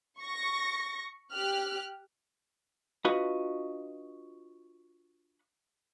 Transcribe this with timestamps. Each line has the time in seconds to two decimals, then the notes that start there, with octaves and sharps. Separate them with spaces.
0.21 C#6 A#6
1.33 G4 F6 F#6
3.05 D4 F4 F#4 B4 D#5